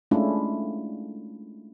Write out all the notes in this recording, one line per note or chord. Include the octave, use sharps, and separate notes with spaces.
G#3 A3 C#4 D4 E4 F4